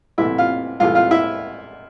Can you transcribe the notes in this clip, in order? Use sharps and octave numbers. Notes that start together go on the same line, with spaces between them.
C2 C3 E3 A3 E4 E5
F4 F5
C2 C3 E3 A3 F4 F5
F4 F5
E4 E5